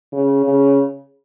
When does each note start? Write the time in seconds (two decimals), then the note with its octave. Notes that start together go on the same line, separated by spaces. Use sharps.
0.13 C#3
0.45 C#3